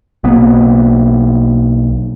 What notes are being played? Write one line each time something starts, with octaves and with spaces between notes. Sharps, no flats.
B1 A#3 B3